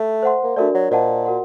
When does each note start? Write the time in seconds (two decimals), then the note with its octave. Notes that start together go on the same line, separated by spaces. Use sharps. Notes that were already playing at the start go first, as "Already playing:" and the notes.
Already playing: A3
0.23 C5 F#5 C6
0.43 A#3
0.56 A3 D4 F#4 A#4 D5
0.74 F#3
0.91 A#2 C5 D#5 F#5 A5
1.25 F#4 A#4 F#5 C6